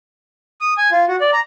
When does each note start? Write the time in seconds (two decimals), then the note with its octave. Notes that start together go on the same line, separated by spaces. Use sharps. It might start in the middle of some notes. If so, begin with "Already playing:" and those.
0.61 D#6
0.78 G#5
0.92 F4
1.08 F#4
1.21 D5
1.33 A#5